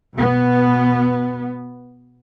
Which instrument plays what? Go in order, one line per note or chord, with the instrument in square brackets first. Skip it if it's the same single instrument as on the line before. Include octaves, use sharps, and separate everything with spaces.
[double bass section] B2 B3